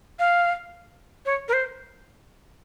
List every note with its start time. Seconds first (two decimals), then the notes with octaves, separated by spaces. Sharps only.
0.19 F5
1.26 C#5
1.48 A#4
1.53 C5